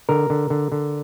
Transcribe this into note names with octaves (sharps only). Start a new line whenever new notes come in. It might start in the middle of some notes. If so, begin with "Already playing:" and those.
D3 A#4
D3
D3
D3